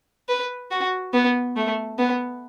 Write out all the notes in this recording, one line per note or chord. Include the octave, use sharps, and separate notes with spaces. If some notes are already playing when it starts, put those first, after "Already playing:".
B4
F#4
B3
A3
B3